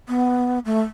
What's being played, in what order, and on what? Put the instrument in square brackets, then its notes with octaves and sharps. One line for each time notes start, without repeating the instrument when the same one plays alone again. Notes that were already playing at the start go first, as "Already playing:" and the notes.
[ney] B3
A3